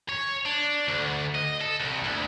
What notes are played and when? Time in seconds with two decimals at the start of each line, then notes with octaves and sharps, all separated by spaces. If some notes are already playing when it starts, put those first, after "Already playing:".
0.09 C#5
0.46 D4
0.88 D2
1.35 D#5
1.61 A4
1.80 C2
2.04 D2